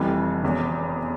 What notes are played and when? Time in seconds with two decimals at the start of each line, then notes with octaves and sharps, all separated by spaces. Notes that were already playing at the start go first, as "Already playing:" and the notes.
Already playing: F1 F2 E3 G3
0.42 E1 E2 C#3